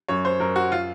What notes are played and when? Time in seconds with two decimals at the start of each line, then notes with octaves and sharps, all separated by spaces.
0.08 F#2 C#5
0.25 C5
0.40 F#2 A#4
0.56 F#4
0.72 F4